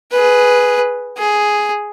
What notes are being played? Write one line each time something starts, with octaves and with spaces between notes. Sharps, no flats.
G#4 B4
G#4